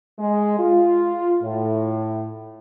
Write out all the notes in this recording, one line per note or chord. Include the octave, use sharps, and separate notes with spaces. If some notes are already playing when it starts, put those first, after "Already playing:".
G#3
F4
A2